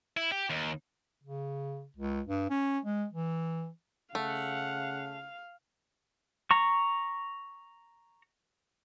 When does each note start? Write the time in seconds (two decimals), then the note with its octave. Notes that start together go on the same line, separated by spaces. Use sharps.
0.17 E4
0.32 G4
0.50 D#2
1.24 C#3
1.97 C#2
2.27 G2
2.50 C#4
2.85 G#3
3.13 E3
4.15 C#3 A3 F5 F#5
6.51 A#5 C#6